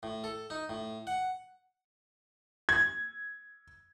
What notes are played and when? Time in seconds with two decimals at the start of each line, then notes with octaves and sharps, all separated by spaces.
0.03 A2
0.24 A4
0.50 D#4
0.69 A2
1.07 F#5
2.69 G#6